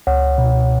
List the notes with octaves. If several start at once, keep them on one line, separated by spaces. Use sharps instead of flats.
C#2 C#5 F#5
B2